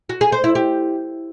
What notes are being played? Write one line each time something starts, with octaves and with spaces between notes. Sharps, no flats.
F#4
G#4
C5
E4
G4